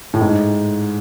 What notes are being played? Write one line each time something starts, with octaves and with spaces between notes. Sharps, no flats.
A2
G#2